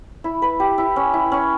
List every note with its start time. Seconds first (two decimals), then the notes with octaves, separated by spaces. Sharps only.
0.24 E4
0.42 B4
0.60 G4
0.78 E4
0.96 C#4
1.13 E4
1.32 C#4